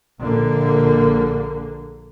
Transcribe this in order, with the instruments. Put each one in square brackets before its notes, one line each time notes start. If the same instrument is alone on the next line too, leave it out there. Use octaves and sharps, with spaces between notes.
[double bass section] A#1 D3 A#3